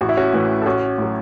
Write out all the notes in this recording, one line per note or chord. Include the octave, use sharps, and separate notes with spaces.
A1 F#4
E4
C#4 F#4
A2 E3
A4
A1 C#4 F#4
A2 F#3